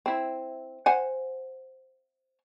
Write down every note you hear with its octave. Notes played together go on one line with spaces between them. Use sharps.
C4 E4
C5 F#5 G#5